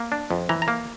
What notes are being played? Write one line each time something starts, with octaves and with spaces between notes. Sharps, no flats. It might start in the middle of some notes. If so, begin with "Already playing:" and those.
Already playing: A#3
D4
F2
E3 A#5
A#5
A#3